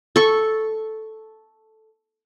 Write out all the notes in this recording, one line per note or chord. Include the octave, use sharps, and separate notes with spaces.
A4 C#6